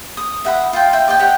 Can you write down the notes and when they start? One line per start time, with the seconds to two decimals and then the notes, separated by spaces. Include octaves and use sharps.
0.17 D#6
0.45 E5 F#5 B5
0.73 F4 G5
0.93 E5 G5
1.08 D5 D#5 G5 G#5
1.19 G4 C#5 F#5 G5